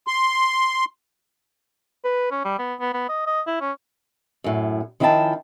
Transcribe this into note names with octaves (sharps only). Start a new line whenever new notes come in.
C6
B4
C#4
G3
B3
B3
B3
D#5
D#5
E4
C#4
F#2 A2
D#3 F3 C#4 E4 G5 A5